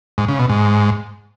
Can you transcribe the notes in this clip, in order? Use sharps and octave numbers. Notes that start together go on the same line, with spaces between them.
G#2
C#3
B2
G#2